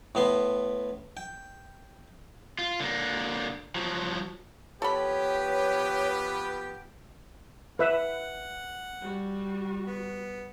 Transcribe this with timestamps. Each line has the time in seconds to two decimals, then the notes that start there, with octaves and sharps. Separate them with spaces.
0.15 A2 B3 C6
1.17 G5
2.59 F4
2.80 D3 A#3
3.75 F3 F#3
4.82 F3 B3 G4 A4 B4 C#5 B5
7.79 B4 E5 F#5
9.01 G3 F#4
9.87 B3